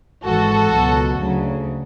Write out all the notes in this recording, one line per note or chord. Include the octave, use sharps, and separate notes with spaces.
G#1 G#2 E3 F#4 A4
C#2 B2 F#3
D2 C#3 F#3